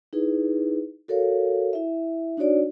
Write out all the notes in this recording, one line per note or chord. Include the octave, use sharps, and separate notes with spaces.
D#4 E4 G#4 B4
F#4 A4 A#4 C#5 F5
E4 E5
D4 D#4 F#4 C#5 D5